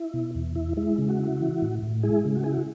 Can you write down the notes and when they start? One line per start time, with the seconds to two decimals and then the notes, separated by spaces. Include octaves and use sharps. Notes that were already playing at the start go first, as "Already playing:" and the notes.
Already playing: E4
0.14 B2
0.35 E2
0.55 E4
0.77 G#3 E4
0.98 C#3
1.09 F#4
1.19 E4
1.41 E3
1.62 A2
1.83 A2
2.03 G#3 E4 G#4
2.25 C#3
2.35 F#4
2.44 E4 G#4
2.52 F#4